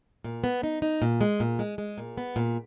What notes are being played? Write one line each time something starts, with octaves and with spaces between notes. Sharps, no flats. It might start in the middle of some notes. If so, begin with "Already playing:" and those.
A#2
B3
D#4
D#4
A#2
G#3
A#2
G#3
G#3
A#2
B3
A#2